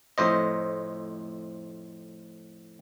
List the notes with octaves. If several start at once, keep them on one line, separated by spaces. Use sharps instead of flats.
F2 A2 C5 D#5